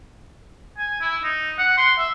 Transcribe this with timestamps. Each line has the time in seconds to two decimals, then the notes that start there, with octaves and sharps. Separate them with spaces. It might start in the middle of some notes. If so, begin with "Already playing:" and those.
0.78 G#5
1.01 E4
1.24 D#4
1.58 F#5
1.77 C6
1.99 E5